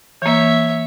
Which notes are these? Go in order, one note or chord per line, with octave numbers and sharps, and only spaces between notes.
E3 A#3 C#5 E5